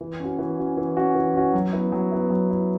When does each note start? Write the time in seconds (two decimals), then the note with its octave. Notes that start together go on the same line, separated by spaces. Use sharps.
0.01 E3
0.20 C#4 F#4
0.39 E3
0.58 C#4 F#4
0.77 E3
0.97 C#4 F#4
1.15 E3
1.34 C#4 F#4
1.53 F#3
1.73 B3 E4
1.92 F#3
2.12 B3 E4
2.30 F#3
2.50 B3 E4